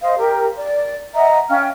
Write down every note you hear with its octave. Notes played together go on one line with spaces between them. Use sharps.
C5 D#5 F5
G4 A#4
D5
D#5 E5 F#5 A#5
C#4 F5 G5 F6